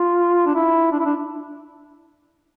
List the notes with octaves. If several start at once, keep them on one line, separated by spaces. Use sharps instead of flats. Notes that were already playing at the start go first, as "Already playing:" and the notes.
Already playing: F4
D4
E4
D4
E4
D4